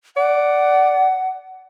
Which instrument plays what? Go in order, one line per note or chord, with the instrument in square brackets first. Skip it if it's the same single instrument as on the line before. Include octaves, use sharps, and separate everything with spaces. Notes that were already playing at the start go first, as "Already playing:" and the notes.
[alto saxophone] D5 [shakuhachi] F#5